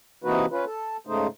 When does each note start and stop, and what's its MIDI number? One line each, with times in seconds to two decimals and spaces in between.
0.24 0.46 48
0.24 0.46 52
0.24 0.46 58
0.24 0.46 63
0.24 0.46 66
0.24 0.46 71
0.51 0.65 61
0.51 0.65 65
0.51 0.65 71
0.66 0.97 69
1.07 1.27 44
1.07 1.27 49
1.07 1.27 57
1.07 1.27 63
1.07 1.27 72